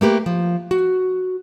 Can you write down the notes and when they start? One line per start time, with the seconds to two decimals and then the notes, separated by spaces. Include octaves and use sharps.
0.01 A3 A#3 G4 B4
0.26 F3
0.71 F#4